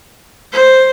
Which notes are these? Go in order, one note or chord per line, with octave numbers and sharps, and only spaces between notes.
C5